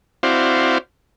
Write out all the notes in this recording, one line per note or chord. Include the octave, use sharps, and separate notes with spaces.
C4 E4 F#4 C5 D5 F5